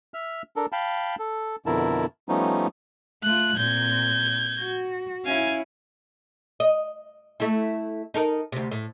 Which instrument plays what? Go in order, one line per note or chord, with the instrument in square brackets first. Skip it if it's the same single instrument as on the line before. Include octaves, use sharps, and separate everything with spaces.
[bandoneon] E5 F6
D4 A4 A#4
F5 G5 A5 B5
A4
F2 B2 D3 E4 A#4 A5
F3 G3 A3 B3 C#4 D#4
[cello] A3 F4 [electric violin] F#6
[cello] A#2 C4 [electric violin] G6 G#6
[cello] F#4
[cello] C#4 E4 [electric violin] F5 G#5
[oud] D#5
A3 E4
D#4 A4 A#4
D2 C3
A2